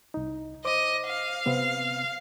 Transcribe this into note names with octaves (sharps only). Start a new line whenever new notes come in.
C2 D#4
C5 D#5 D6
F5
C3 B3 C4